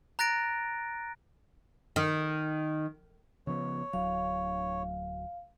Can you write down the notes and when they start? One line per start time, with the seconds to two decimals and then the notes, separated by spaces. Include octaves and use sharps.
0.19 A#5 F#6 A6 A#6 D7
1.96 D#3
3.47 C#3 F3 B3 C#5
3.93 D1 F#3 F5